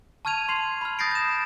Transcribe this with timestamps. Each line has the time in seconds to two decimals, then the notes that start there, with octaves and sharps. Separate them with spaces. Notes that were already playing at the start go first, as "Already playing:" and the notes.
0.25 A5 C#6 F6 G#6 D#7 F7
0.49 C6 C7 F7
0.81 B5 F6
0.99 D#6 G6 A6 A#6 C7 D7
1.11 G6 E7